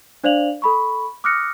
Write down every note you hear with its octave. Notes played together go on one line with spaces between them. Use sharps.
D4 C5 D5 F5 F7 F#7
A4 B5 C#6
D6 D#6 F6 F#6 A#6 C#7